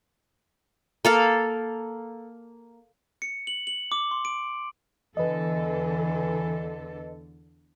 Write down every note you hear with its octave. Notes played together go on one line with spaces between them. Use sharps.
A#3 A4 F5
C#7
F#7
F#7
D6
C6
D7
E2 D3 E3 A4 B4 D#5